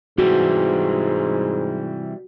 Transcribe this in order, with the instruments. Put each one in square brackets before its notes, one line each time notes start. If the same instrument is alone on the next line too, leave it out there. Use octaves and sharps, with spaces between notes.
[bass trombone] G#2 [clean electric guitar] C3 E3 G3 [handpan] F#4